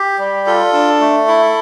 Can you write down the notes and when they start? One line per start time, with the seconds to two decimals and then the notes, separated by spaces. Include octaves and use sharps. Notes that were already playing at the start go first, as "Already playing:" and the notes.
Already playing: G4
0.19 G3
0.46 F4 A4
0.73 D4
1.01 A3
1.27 E4